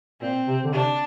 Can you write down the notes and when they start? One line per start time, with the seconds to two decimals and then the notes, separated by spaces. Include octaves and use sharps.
0.21 A#2 C4
0.47 C3
0.64 D3
0.73 C3 D4